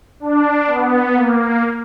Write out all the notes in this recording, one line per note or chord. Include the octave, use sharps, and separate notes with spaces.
D4
B3
A#3